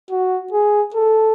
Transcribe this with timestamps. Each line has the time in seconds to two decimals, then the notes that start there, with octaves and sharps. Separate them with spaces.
0.11 F#4
0.53 G#4
0.94 A4